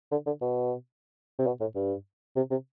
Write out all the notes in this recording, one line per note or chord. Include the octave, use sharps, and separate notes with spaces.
D3
D3
B2
C3
B2
A2
G2
C3
C3